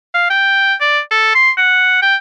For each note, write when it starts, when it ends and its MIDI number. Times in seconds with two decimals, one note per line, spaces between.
0.14 0.28 77
0.30 0.74 79
0.81 1.00 74
1.11 1.33 69
1.35 1.51 84
1.58 2.00 78
2.02 2.16 79